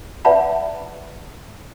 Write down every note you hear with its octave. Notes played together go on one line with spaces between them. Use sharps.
B4 D5 E5 F#5 A5 B5